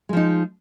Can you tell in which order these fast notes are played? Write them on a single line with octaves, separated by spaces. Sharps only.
G#3 F3 D#4